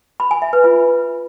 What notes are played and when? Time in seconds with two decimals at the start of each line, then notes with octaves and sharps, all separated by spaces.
0.20 B5
0.31 G#5
0.42 E5
0.53 B4
0.64 F4